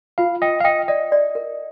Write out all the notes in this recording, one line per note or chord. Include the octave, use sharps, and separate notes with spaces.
F4 F5
D#5 G5
F5
D#5 G5
D5 D#5
D5
A#4